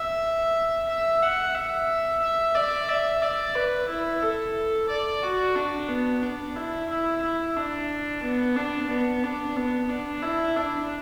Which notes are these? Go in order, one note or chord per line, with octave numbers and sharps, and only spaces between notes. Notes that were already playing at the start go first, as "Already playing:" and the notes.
Already playing: E5
E5
F#5
E5
E5
D5
E5
D5
B4
E4
A4
D5
F#4
D4
B3
D4
E4
E4
E4
D4
B3
D4
B3
D4
B3
D4
E4
D4